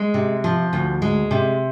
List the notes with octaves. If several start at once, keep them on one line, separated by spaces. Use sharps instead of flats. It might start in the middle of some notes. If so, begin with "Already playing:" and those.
Already playing: G#3
C3
F3
D2
G#3
C3